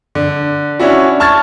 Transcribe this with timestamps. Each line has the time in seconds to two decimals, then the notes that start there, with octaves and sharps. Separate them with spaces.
0.15 D3
0.80 C#4 D4 E4 F#4
1.20 A5 C#6 F6 G#6 A6